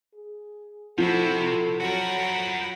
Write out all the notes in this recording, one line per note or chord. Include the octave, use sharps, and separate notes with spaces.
G#4
C3 F3 E4 F#4 A4
F#3 F#4 A#4 F#5 B5